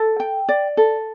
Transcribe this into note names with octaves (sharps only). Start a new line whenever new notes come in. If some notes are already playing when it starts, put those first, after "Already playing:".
Already playing: A4
G5
D5
A4